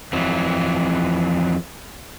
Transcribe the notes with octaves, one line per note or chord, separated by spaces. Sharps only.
F2 E3 F#3